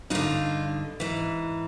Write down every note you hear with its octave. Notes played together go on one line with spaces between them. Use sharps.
G2 D3 D#4 F4
G#2 E3